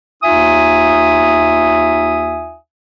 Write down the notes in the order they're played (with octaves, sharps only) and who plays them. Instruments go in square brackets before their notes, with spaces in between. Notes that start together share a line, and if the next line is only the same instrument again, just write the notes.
[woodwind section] D#2 D#4 F4 E5 G#5 D#6